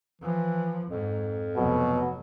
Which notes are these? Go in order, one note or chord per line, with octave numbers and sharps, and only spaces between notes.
E3 F3
F2 G#2
F1 B2 F#3